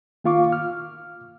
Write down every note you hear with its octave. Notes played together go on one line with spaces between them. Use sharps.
D#3 A#3 F4 F5 C#6 D6
F6